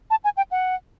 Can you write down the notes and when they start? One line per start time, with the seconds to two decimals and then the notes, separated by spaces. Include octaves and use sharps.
0.10 A5
0.24 G#5
0.37 G5
0.51 F#5